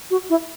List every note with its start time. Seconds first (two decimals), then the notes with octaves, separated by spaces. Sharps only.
0.10 F#4
0.30 E4